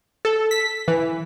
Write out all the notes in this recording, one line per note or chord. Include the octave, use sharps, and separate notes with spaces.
A4
B6
E3